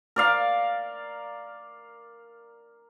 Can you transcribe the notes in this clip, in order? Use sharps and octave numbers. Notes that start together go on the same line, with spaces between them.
A#4 D5 F5